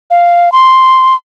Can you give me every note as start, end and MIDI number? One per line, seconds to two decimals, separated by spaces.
0.10 0.52 77
0.52 1.15 84